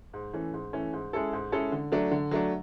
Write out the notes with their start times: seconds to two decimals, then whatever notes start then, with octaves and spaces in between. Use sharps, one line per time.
0.13 G#2
0.34 E3 A3 C#4
0.54 G#2
0.73 E3 A3 C#4
0.93 G#2
1.13 G#3 C#4 E4 A4
1.33 G#2
1.52 G#3 C#4 E4 A4
1.72 D3
1.92 F#3 A3 D4
2.11 D3
2.31 F#3 A3 D4